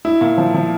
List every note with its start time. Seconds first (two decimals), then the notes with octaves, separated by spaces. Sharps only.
0.05 E4
0.21 A#2
0.38 F3
0.54 F3